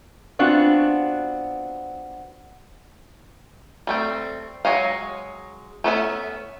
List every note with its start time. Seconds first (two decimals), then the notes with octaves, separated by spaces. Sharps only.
0.39 B3 C4 D4 F4 F#4
3.87 G3 A3 C4
4.65 F#3 G#3 C#5 D#5 F5
5.84 A3 B3 C#4 E5